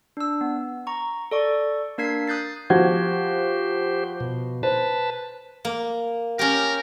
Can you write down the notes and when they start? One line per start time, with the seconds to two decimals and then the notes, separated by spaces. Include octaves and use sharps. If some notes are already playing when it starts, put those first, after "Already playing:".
0.17 D4 E6
0.41 B3
0.87 A#5 C#6
1.31 A4 D5 C#6
1.98 A#3 D4 A#4 G#6 B6 C7
2.28 D#6 F#6 G6 A6 C7
2.70 F3 F#4 G4 C5 G#6
4.20 B2
4.63 B4 C5 A5
5.65 A#3
6.39 C#4 G4 A#4